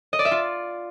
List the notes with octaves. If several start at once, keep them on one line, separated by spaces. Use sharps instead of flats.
D#5
D5
E5
F4